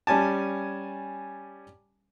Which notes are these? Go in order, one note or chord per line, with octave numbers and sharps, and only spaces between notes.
G3 C#4 G#5 A5